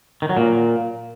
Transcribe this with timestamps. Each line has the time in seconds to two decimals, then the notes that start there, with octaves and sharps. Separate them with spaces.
0.22 D#3
0.29 F#3
0.37 A#2